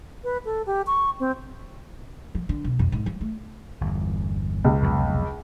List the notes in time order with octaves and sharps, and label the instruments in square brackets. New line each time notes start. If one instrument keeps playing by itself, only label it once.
[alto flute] B4
A4
G4
C#6
C4
[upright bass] F3
D3
B1
F2
G#2
F3
A3
[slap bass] G1 E2
[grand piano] C#2
[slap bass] F1 B1 F2